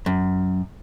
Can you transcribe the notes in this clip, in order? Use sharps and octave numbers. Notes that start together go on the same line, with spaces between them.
F#2